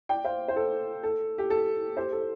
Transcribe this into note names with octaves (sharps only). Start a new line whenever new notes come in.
D5 G5
C5 F5
C5
A4
A4
G4
A4
G4 C5
A4